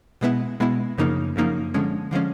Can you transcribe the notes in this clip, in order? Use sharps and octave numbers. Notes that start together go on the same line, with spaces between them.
B2 G#3 B3 E4
B2 G#3 B3 E4
F#2 C#3 F3 A#3 D#4
F#2 C#3 F3 A#3 D#4
D3 F3 G#3 C#4
D3 F3 G#3 C#4